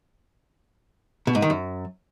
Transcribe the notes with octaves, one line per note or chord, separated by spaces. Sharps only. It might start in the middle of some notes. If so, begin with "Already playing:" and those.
B2
G#2
D#3
F#2